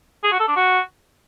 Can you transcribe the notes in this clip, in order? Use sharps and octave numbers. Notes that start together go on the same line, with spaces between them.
G#4
F#4
A4
D4
F#4